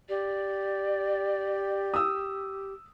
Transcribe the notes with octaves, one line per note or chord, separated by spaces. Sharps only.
G4 D5
D#6 E6